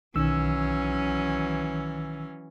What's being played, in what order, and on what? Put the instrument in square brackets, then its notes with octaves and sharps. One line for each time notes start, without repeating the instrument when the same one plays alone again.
[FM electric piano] B1 D#3 E6 [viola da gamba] E3 F#3 C#4